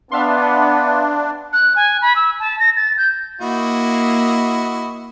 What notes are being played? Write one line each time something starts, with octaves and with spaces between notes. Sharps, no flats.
B3 D4 E5 F5 C6
F#6
G#5
B5
E6
A5
A#6
A6
G6
A#3 E4 F#4 D#5